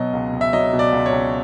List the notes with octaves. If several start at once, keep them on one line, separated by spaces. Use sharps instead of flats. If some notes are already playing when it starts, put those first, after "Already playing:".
Already playing: B2 F#3 D#5
C#2
C#2
E5
F#3 D#5
B2
D5
C#2
C#5
C#2